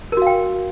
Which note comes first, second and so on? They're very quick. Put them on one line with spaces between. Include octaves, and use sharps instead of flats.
A#4 F#4 F5 G5